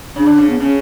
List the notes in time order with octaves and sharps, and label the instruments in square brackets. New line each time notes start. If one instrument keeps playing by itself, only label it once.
[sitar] C#3 [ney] D4
[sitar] D3
C#3
[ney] B3
[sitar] C#3 [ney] C#4